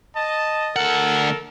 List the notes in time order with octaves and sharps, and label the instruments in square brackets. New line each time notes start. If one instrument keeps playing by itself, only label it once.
[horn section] D#5 A5
[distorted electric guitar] D2 F#5 [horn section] A4 A#4